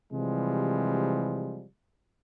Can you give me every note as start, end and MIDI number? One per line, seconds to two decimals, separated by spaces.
0.12 1.64 48
0.12 1.64 52
0.12 1.64 53
0.12 1.64 55
0.12 1.64 56